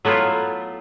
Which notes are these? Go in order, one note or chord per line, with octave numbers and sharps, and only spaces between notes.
F#3 A3 B3 E4 F4